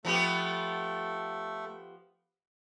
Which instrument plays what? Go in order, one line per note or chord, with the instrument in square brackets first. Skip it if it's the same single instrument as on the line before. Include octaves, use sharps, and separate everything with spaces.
[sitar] F3 B3 G4 [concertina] A3 A4